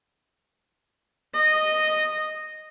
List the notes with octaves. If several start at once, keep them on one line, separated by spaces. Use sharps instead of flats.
D#5